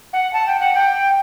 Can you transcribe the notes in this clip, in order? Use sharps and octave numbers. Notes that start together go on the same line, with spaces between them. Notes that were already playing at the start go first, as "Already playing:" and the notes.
F#5
A5
G5
F#5
G5